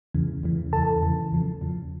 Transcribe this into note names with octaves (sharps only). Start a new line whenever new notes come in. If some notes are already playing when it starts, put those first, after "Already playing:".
E2 C#3 E3
E2 C#3 E3
E2 C#3 E3 A4 A5
E2 C#3 E3
E2 C#3 F3
E2 C#3 F3